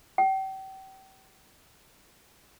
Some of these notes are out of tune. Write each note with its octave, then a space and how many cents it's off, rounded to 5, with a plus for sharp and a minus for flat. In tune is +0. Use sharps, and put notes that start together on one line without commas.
G5 -35